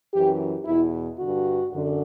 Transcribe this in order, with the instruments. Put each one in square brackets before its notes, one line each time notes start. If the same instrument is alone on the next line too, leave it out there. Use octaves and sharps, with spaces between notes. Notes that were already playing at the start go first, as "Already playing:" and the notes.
[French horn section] F#2 E3 G4
E2 B2 E4
G2 D3 F#4
F#2 D3